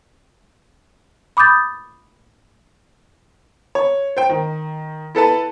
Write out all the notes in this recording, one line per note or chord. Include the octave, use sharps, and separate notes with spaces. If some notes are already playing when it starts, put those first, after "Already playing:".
B5 D6 D#6 G6 A6
C#5
C5 G5
D#3
E4 A4 B4 A5